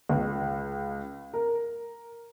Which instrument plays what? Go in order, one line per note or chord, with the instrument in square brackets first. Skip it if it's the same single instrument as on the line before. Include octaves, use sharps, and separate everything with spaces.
[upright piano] C#2
A#4